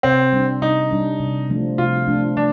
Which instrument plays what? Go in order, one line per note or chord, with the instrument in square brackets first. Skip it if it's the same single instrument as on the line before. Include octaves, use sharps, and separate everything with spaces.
[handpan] C3 [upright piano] C4
[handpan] G3 D4
[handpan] C3 [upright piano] D#4
[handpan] G3 D4
C3
F3 A3 D4
[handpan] C3 [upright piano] F4
[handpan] F3 A3 D4
[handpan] F3 [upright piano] D4